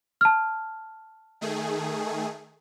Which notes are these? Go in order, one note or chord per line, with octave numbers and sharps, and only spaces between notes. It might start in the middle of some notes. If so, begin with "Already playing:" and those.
A5 F6
D#3 A3 G#4